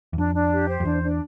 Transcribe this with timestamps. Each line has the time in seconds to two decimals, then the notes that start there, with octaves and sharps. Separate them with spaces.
0.13 E2
0.17 F2 D4
0.34 D4
0.52 G4
0.69 C5
0.80 F2
0.85 E2 D4
1.03 D4